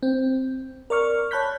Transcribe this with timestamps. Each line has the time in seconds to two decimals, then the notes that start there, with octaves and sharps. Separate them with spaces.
0.03 C4
0.90 A#4 D5 C#6 F6
1.31 C#5 A5 B5 F#6 G6 B6